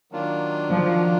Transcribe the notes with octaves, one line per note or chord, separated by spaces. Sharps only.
D#3 F#3 A#3 D4 F4
F3